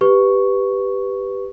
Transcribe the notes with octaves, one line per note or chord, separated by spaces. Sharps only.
G4 B4 C#6